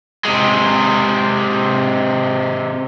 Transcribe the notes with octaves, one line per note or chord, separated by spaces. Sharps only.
C3 G#3